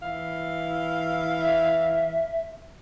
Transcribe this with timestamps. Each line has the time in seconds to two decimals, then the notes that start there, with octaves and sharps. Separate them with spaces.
0.03 E3 E4 F5
1.41 E5